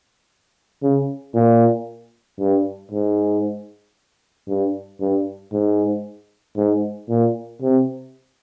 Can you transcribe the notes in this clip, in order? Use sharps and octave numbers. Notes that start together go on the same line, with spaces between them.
C#3
A#2
G2
G#2
G2
G2
G#2
G#2
A#2
C3